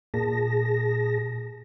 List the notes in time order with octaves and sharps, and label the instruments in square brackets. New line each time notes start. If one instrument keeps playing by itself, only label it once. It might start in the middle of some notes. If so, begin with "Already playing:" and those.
[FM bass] A#2 [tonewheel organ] G#4 A5 A#6